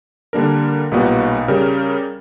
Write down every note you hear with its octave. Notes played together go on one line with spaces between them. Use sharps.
D3 G3 A#3 D4 A#4
B1 A#2 G3 B3 F#4
C#3 G3 C#4 G4 A#4